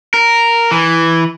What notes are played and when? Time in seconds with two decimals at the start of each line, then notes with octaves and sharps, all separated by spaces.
0.14 A#4
0.71 E3